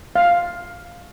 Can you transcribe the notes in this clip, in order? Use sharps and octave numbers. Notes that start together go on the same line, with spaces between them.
F5